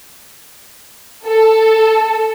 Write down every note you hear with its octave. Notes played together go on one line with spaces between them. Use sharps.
A4